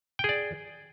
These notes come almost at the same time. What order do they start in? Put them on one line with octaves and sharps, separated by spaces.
G5 G#4 D5